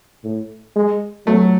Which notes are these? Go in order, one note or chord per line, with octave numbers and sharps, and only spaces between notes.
A2
G#3
F#3 A3